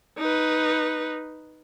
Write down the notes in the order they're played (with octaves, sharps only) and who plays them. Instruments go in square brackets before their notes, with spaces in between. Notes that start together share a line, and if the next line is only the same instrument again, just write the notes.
[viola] D#4 B4